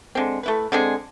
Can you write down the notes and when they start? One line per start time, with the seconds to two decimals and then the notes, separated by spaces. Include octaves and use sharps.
0.15 D3 G#3 C4
0.43 A3 E4 B4
0.72 D3 G#3 C4 G#4